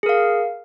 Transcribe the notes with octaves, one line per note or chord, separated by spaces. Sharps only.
G#4 A#4 F5